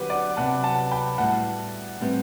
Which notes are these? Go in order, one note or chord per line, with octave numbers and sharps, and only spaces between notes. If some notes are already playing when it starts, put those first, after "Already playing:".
Already playing: D3 F#3 B3 G4 B4
D5 F#5
C3 F#3 B3 F#4 F#5 A5
F#5 A5
G5 B5
A2 G3 B3 F#4 F#5 A5
A2 G3 C4 G4 B4